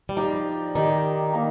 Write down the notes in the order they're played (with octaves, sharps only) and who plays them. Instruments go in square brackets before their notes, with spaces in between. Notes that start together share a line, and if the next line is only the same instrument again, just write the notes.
[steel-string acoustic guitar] G3
[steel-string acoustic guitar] F3 [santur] D#4 G4 D5
[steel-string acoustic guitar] D#3 [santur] D#4 G4 D5
[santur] A#3 D#4